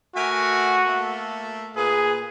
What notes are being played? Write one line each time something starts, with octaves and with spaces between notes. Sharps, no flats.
A3 F#4 A#4 G#5
A3 A#3 A4
A#2 G#4 B4